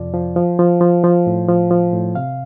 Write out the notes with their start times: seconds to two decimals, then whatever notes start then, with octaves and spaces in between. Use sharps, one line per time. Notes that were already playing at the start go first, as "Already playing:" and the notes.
Already playing: F2 C3 F3 D5
0.14 F3
0.36 F3
0.59 F3
0.81 F3
1.03 F3
1.27 A2
1.48 F3
1.71 F3
1.93 A2
2.15 C3 F5